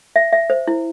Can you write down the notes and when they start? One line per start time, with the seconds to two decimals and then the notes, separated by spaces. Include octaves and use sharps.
0.16 E5
0.33 E5
0.50 C5
0.67 E4